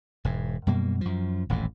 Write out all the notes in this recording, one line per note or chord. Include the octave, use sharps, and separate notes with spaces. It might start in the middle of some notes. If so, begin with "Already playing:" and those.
E1 G#2
F#2 B2 G3 A#3
F#2 F3
D#1 A1 F2 A2